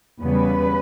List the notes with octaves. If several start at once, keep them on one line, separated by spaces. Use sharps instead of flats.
E2 C#3 G3 B3 B4